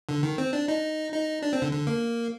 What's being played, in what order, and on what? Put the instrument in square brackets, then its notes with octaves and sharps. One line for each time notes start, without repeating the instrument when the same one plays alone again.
[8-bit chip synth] D3
D#3
C4
D4
D#4
D#4
D4
C4
D3
D3
A#3